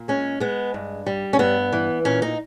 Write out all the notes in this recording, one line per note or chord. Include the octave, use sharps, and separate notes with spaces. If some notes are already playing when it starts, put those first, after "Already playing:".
Already playing: A#2
G#3 C#4
G#3 B3
G2
G3
C#4
G2 B3
E3
A#2 C#4
D#4